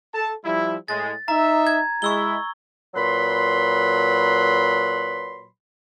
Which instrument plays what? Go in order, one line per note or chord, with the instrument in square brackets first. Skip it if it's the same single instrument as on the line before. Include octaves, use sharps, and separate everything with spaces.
[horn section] A4 A5
F3 G3 E4
[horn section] A2 G#3 [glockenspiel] A6
[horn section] D#4 E5 [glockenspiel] A#5
[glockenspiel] G#6
[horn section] G#3 E4 [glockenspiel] C#6 E6 G7
[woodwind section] A#2 F#3 B4 B5 C6